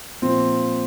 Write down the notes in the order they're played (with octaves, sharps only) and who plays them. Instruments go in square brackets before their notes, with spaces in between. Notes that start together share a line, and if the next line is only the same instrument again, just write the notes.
[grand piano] A#2 F3 C4